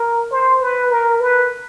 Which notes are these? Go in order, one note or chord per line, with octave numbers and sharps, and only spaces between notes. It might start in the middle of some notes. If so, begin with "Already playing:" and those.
Already playing: A#4
C5
B4
A#4
B4